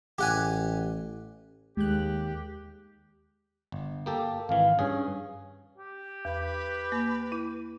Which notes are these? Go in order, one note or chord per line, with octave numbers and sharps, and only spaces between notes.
A1 G4 F#5 G#5
D#2 G#3 G4 F#6
G1
A#3 G4 A4
G#1 E3 F5
G2 C#4 G#4
G4
E2 B4
A#3
E4